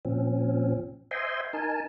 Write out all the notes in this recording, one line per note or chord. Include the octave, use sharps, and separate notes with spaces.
A#2 F3 C4 C#4
C5 D#5 E5 G5 G#5 C6
D#4 A#4 G#5 A5